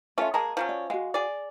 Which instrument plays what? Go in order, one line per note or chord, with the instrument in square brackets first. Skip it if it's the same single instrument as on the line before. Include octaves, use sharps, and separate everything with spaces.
[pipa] A3 C#4 F4 [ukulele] C#5 E5
[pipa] G#3 A#3 G#4 [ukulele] D#5 A5 A#5
[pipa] F3 F#3 C#4
[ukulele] D5
[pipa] G#3 [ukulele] F#4 F5
[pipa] G#4 D5